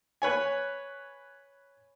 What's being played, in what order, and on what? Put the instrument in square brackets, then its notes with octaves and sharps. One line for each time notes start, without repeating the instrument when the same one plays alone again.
[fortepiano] B4 C#5 G#5